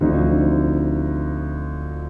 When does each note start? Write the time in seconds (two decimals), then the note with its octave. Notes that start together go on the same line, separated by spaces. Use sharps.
0.01 D2 D3 F3 C4 D#4